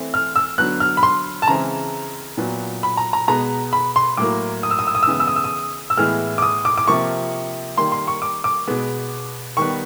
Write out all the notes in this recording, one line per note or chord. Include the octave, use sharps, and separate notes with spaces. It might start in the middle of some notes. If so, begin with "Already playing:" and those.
Already playing: E3 A3 C4
F6
E6
D3 F#3 B3 F#6
F6
B5
C6
A5
C#3 E3 G#3 C4 A#5
A#2 F#3 B3
B5
A#5
A#5
B2 G#3 B3 A#5
B5
C6
A2 F#3 A#3 D6
D#6
E6
D#6
E6
D#6
E6
C#3 E3 G#3 B3 D#6
E6
D#6
E6
D#6
E6
A2 E3 G#3 B3 F6
D6
D#6
D6
D6
C3 F3 A#3 C#6
D#3 G3 A#3 C6
C6
C#6
D6
D6
B2 G#3 B3
D#3 G3 B3 C#6